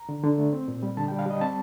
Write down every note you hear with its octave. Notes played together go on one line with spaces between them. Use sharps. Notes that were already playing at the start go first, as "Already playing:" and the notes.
Already playing: A#5
D3
D3
A3
C4
A#2
G3
D3 A5
G5
G3
F5
G3 D#5
C4 A5